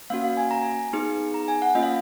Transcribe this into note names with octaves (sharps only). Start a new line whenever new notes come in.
A#3 C#4 F#4 F5
F5
G#5
A#5
G#5
B3 D#4 G#4
A#5
G#5
F#5
A#3 C#4 F4 D#5
F5